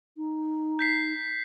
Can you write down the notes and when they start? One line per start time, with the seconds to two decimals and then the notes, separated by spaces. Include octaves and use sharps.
0.17 D#4
0.79 G6 B6 C7